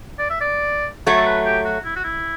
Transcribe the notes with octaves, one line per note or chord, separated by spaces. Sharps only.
D5
E5
D5
F#3 A3 C#5
A4
B4
G4
F#4
E4
F#4
E4